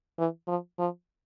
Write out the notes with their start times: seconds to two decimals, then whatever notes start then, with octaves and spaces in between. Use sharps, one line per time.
0.18 E3
0.47 F3
0.79 F3